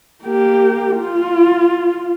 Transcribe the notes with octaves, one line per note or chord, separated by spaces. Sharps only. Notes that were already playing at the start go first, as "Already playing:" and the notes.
A#3 G4
F4